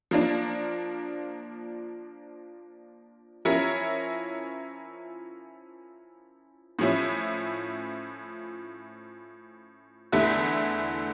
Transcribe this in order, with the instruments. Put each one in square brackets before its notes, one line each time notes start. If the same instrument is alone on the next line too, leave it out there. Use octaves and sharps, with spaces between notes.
[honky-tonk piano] F3 A#3 D4
F3 C#4 E4 A#4 C#5
A2 F3 C#4 E4
E2 D3 A3 E4